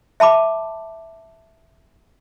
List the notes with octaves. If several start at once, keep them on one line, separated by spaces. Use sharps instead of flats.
E5 A5 B5 D6